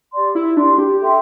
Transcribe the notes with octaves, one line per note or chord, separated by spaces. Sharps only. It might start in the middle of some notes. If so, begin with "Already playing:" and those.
G4 D5 C6
E4
D4 G4 D5 C6
G4
A4 E5 G5 C6